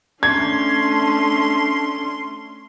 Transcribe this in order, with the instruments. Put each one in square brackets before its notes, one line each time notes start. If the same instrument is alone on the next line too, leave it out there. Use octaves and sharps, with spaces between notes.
[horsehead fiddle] A3 D4 [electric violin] C#4 C6 [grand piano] G#6